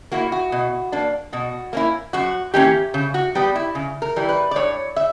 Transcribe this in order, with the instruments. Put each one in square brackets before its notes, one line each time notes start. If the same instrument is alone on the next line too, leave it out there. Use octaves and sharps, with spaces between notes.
[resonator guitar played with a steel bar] A#3 E4 F#4
F#4
B2
A#3 D4
B2 F#4
A#3 C#4 E4
F#2 F#4
E3 A#3 C#4 G4
C#3
F#4
G3 B3 G4
E4
C#3
A#4
E3 G3
B4
D5
G2 C#5
E5